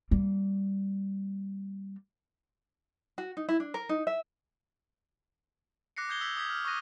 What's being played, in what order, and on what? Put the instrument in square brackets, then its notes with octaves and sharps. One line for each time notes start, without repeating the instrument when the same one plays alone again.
[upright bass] G3 A#3
[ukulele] F#4
D#4
E4
D4
A#4
D#4
E5
[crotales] D6 F#6 A#6 C7 C#7
D#6 G6 G#6 C7 G7
E6 G#6 B6 F#7 G7
D#6 G6 G#6 B6
F6
C#6 D#6 E6 F#6 A#6 D#7